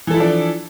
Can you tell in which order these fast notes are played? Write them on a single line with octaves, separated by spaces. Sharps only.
E3 A4 E4 F3 D4